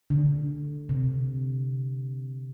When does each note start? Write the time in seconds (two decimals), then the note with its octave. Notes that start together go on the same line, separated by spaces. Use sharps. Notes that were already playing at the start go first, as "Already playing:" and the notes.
0.10 D3
0.89 C3